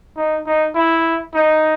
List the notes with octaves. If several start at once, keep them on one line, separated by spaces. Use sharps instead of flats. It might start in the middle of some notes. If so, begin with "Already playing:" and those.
D#4
D#4
E4
D#4